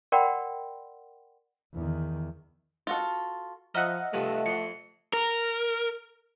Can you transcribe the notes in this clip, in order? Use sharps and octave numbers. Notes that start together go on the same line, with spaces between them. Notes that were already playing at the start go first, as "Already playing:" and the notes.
A#4 D5 F#5 G5 B5 C6
E2 D#3
F4 F#4 A4
F3 D#4 D#5 E5 F#5 F6 F#6
G2 C3 F3 A3
F2 C6 C#7
A#4